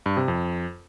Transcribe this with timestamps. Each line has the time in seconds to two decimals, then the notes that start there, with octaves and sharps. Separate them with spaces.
0.06 G2
0.17 C3
0.28 F2